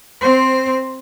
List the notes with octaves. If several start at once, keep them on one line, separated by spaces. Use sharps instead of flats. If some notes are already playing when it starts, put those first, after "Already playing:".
C4 C5